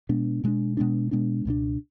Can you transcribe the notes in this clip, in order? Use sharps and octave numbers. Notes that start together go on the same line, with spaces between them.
B2 G#3 B3 D4
B2 G#3 B3 D4
B2 G#3 B3 D4
B2 G#3 B3 D4
C#2 B2 A3 D4